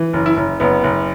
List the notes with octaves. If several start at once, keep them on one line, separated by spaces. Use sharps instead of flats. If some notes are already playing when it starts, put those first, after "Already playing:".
Already playing: E3
F#1
E4
F#1
F#1 B3
F#1